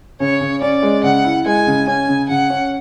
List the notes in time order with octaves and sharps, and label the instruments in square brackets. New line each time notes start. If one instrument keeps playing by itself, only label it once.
[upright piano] C#3 [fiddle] C#5
[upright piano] C#3
[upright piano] C#4 [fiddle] D5
[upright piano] G#3
[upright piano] C#3 [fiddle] F#5
[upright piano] E4
[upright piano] G#3 [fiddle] G#5
[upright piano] C#3
[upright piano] C#4 [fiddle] G#5
[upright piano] C#3
[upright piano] C#3 [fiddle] F#5
[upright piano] C#4